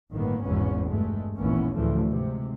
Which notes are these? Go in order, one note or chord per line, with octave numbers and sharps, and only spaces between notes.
G1 A2 D#3 A#3 B3
G#1 E2 G#2 B2 B3 C#4
G2 G#3 A3
A1 D#2 A#2 E3 B3 C#4
D2 A2 C#3 E3 F3 A3
G#2 C3